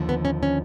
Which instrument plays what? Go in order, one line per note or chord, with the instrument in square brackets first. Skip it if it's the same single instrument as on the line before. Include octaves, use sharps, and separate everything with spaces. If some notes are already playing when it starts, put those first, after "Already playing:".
Already playing: [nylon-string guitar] D#2 D3 F3
B3
C#4
C#4